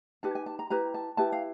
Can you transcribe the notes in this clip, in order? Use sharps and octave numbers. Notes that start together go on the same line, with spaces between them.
D#4 G4 B4 A5
G#5
A5
A#5
E4 G4 B4 A#5
A5
E4 G4 B4 A5
F5